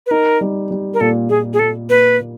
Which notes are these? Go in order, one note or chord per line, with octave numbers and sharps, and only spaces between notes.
B4
D#4 A#4
G3
G3
A#4
A#2 A4
A#2 G#4
G#4
A#2 A4
A#3 B4
A#2